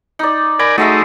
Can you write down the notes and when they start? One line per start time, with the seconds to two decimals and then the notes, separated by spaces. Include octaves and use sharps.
0.19 D#4 D5
0.59 A#4 D5 G#5 B5
0.78 F#3 G#3 A3 D#4 E5